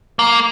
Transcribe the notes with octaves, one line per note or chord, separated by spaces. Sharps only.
A#3